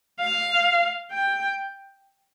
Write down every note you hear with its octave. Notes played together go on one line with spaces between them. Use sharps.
F5
G5